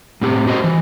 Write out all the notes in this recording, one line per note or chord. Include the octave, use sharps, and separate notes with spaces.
A2 C4 G4
F#4 C5 D#5
E3